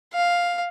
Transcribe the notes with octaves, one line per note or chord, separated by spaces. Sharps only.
F5